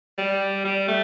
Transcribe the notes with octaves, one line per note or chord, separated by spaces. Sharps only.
G3
G3
A3